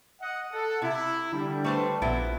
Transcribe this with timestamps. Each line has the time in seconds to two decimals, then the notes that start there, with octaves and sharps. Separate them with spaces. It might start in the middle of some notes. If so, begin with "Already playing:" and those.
0.20 D#5 F#5
0.51 A4 F#5
0.82 C3 E4
1.33 D3 G3
1.64 A3 B4 C5
2.02 A#1 A#2 B3 E4